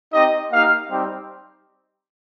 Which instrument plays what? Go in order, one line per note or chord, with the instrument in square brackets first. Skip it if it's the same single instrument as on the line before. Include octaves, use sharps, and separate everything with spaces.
[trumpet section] C4 D#4 G4 D#5
A#3 D#4 G4 F5
G3 C4 D#4 G4